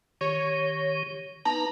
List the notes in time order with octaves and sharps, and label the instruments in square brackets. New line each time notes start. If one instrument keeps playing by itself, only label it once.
[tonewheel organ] D#3 G4 [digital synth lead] C#5
[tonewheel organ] B3 D#4 B4 [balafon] A5 [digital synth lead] A#5